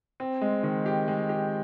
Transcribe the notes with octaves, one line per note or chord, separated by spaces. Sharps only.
C4
G#3
D#3
G4
G#3
G4